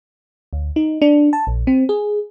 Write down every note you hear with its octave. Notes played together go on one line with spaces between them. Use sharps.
D2
D#4
D4
A5
A#1
C4
G#4